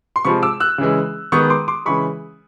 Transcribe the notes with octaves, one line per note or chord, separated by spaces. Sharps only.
C6
C3 F3 G#3 B5 C#6
D6 E6
E6 F#6
C#3 E3 G#3
D#3 G#3 B3 C#6 D#6
C6 D6
C6 D6
C#3 E3 G#3 B5 C#6